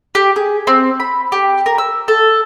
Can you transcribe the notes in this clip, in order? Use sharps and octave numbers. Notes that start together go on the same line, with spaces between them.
G4
G#4
C4
B5
G4
A#4
E6
A4